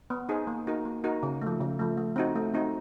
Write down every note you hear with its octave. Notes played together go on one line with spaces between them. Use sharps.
B3
D#4 G#4 C5
A#3
D#4 F#4 A#4
A#3
D#4 F#4 A#4
C#3
A3
F3
C#3
F3 A3
A3
C4 D#4 F#4
A3
C4 D#4 F#4